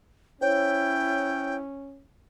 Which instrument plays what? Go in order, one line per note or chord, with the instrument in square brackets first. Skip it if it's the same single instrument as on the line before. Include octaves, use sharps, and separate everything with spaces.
[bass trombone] C#4 [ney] E4 [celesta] C5 C#5 [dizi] G5